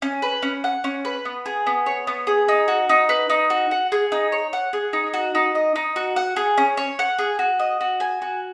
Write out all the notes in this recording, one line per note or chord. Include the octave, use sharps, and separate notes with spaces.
C#4
B4
C#4
F#5
C#4
B4
B3
G#4
B3
C#5
B3
G#4
D#4
F#4
D#4
B4
D#4
F#4
F#5
G#4
D#4
C#5
F#5
G#4
D#4
F#4
D#4
D#5
D#4
F#4
F#5
G#4
C#4
C#5
F#5
G#4
F#4
D#5
F#4
G#5
F#4